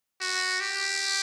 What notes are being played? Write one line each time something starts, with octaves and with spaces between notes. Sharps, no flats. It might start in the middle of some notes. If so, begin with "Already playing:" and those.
F#4
G4